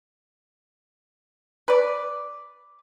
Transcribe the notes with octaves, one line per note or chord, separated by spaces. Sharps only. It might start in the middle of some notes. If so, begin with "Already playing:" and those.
B4 D5